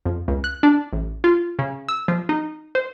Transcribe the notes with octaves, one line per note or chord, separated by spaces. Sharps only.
F2
C#2
F#6
D4
A1
F4
C#3
E6
F3
D#4
C5